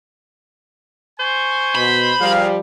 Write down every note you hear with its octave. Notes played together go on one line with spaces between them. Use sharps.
C5 G#5 C#6
B2 B5
F3 G3 G#4 A#4 F5